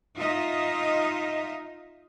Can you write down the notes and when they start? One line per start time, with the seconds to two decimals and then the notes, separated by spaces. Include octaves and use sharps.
0.16 D#4 F4 D#5 E5